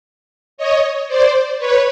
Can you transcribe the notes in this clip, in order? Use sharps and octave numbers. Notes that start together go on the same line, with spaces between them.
C#5 D#5
C5 D5
B4 C#5